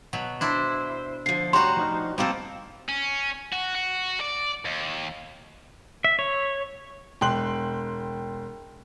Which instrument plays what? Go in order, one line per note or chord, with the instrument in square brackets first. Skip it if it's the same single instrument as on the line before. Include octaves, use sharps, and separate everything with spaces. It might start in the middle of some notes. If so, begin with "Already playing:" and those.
[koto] B2 F#3
[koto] D4 E4 [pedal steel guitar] C5
[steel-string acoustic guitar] D3 F3 [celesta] C7
[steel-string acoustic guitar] A2 C5 A#5 [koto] G3 F#4 [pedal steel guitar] C#5 [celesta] C6
[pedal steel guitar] F3 D#4 F6
[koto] F3 A#3 A4 [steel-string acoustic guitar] G3 C4 [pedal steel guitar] C5 G5
[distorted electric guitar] C#4
F#4
F#4
D5
D#2
[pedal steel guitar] E5
C#5
[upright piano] E1 G5 C6 F#6 F#7